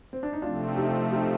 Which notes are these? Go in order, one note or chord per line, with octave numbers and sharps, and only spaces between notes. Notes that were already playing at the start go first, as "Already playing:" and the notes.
C4
D4
D#4
C3 F3 A3 C4 D4 F4
D#4 G4
D#4 G4